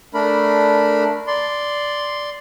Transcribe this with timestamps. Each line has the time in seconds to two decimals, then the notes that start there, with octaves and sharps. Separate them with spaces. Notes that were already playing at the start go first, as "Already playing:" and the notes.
0.14 A3 D4 A#4 B5
1.27 D5 C6